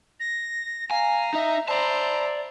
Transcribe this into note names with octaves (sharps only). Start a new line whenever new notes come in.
A#6
F5 G#5 A#5
D#4 D#5 E5
C5 D5 E5 A5 A#5